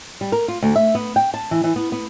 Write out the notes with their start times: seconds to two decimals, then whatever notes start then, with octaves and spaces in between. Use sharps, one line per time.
0.21 G3
0.32 A#4
0.48 F4
0.63 D2
0.76 E5
0.95 B3
1.16 G5
1.34 A5
1.51 E3
1.64 E3
1.76 B3
1.92 B3